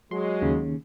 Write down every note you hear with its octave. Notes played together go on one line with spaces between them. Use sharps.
F#3 G#3 C6
D#2 C#3